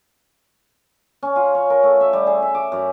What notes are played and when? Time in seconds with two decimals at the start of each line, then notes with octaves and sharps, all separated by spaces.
1.23 C#4
1.36 F4
1.55 C#5
1.70 A#4
1.83 A3
2.01 E5
2.13 G3
2.27 G#4
2.42 E5
2.55 D6
2.72 F#2